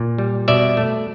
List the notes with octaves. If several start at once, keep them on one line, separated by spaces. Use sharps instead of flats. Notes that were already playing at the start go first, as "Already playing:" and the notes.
Already playing: A#2
G3
B2 D5 E5
A3